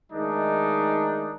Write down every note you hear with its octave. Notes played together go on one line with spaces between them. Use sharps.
D#3 G#3 A3 D4 D#4